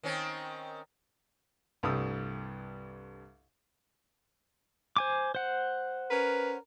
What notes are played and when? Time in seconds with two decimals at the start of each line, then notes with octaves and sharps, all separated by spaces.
0.03 D#3 C4 C#4
1.83 C2 G2 G3 A3 D#6 E6
4.96 C5 G#5 D6
5.35 C5 F#5
6.10 C#4 A#4 B4